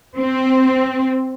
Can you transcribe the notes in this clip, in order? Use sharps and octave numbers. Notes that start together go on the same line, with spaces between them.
C4